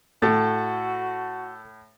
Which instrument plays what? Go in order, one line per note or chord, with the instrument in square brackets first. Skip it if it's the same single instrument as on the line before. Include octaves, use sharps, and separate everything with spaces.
[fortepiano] A2 [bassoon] F#4 [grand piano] A4 A6